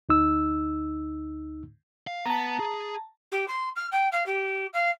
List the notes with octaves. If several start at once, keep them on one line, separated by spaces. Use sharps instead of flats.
D2 D#4 E6
F5
B3 A5 A#5
G#4
G4
C6
F6
G5
F5
G4
F5